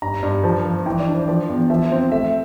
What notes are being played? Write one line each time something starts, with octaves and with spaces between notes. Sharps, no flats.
G2 A#5
G2
F3 A5
F3
E3 G5
D5
D4
C5
F3 D5
E2
F3 E5
C4
A3 E5